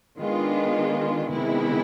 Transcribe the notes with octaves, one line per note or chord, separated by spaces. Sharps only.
D#3 G#3 B3 D4 F4
C3 D#3 G#3 B3 E4